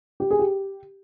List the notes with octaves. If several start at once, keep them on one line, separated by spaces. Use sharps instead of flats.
G4
G#4
G4